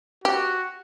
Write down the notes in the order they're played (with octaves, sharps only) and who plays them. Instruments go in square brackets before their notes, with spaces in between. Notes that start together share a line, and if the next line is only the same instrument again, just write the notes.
[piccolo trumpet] F#4 [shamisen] G4